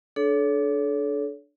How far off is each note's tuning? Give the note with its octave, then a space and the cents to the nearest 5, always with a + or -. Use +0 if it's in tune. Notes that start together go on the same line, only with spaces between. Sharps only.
D4 +0 A4 -30 C#5 +30